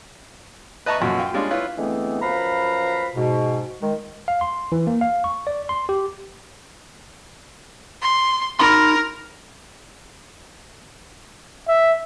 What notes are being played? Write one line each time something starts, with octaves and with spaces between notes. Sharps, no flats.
B4 D#5 E5 A5 A#5 C#6
A1 F#2 B2 F3
F4 G5
G3 G#3 C#4 D4 F4
E4 F4 B4 C#5
D3 E3 G#3 A3 B3 C4
F#2 F3 B4 F5 A#5 B5
G#2 B2
D#3 G#3
F5
C6
E3
A#3
F5
C#6
D5
C6
G4
C6
D#4 A#4 B5 C6
E5